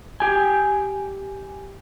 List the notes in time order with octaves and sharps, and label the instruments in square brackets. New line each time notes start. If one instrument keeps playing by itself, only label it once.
[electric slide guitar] G4 G#5